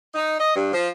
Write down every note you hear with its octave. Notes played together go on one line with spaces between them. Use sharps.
D#4
D#5
G2
F3